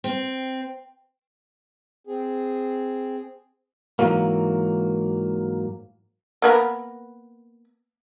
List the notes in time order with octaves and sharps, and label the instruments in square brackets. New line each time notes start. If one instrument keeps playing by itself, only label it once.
[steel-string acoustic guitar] C4
[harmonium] C4 G#4
[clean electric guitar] G#2 B2 E3 F#3 A#3
[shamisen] A#3 B3 A#4